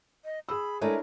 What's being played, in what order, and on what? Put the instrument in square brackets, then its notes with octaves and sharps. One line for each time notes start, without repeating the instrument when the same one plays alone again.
[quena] D#5
[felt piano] G#4 E6 [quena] B5
[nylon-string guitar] G#3 A3 [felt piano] D4 E4 C#5 [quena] A#4